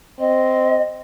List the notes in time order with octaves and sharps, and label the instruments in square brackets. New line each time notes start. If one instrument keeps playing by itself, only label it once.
[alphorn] C4 [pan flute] D#5